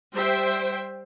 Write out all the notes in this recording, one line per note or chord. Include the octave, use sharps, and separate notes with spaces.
G3 C5 E5 G5